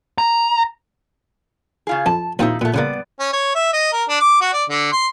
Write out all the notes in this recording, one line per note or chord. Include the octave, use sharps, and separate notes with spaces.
A#5
C#3 F4 G#4
F2 A5
D#2 A#2 F3 C4 D#4 E4
A#2 A3 B3
C#3 G3 A#3 B3 D5
C#4
C#5
E5
D#5
A#4
D4
D6
F#4
D5
D3
C6